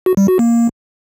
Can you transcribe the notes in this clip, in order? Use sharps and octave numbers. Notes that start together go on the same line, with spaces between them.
F#4
G3
F#4
A#3